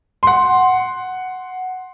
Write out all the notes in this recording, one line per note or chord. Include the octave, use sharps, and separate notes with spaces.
F#5 C6